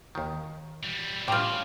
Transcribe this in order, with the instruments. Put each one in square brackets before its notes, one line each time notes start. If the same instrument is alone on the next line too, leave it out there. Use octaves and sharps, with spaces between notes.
[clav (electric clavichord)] D#2 D#3
[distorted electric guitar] E3 G3
[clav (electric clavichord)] A2 G3 [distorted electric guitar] C#3 [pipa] F4 G4